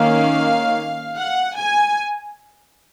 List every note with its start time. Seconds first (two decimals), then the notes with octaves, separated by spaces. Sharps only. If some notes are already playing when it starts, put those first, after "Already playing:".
Already playing: D#3 A#3 C#4 F5
1.18 F#5
1.57 G#5